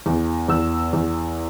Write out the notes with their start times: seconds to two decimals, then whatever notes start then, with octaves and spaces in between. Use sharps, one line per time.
0.06 E2
0.48 E2 E6
0.93 E2